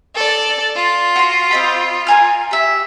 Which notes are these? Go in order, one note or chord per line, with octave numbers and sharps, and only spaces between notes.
A4 D5
F4
F#4 C6
C4 D#5 B5
A#4 G#5 F6
G4 E5